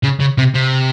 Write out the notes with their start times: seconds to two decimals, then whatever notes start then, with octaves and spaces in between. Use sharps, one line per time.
0.03 C#3
0.20 C#3
0.38 C3
0.55 C3